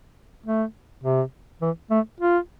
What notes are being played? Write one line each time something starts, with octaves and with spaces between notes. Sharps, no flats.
A3
C3
E3
A3
F4